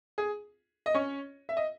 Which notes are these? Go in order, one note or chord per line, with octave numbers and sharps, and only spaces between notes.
G#4
D#5
C#4 C#5
E5
D#5